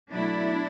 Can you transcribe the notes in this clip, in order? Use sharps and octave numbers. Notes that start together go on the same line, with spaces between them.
B2 F#3 A3 D4 E4